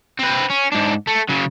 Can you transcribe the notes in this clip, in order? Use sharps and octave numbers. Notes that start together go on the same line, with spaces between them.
C4 B4
C#4
G#2 D4
A3
C#3 F#3